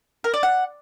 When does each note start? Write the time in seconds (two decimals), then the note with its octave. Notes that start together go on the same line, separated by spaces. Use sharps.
0.24 A#4
0.34 D5
0.43 F#5